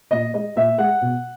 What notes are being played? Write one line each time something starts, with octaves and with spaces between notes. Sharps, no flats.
A#2 D#5
G#3 D#5
A#2 E5
G#3 F#5
B2